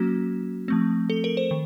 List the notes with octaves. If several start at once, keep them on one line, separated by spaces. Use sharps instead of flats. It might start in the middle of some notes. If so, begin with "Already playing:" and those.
Already playing: F#3 A#3 C#4 F#4
F3 A3 C4
A4
A#4
C5
D#3